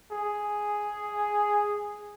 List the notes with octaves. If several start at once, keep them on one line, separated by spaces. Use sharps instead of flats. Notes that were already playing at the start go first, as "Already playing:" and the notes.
G#4